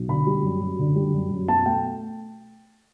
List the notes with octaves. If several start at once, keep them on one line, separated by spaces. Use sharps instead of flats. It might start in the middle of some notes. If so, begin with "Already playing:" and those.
Already playing: B1
D3 B5
G3
F#2
F#2
D3
G3
F#2
F#2
B2 A5
A3 G5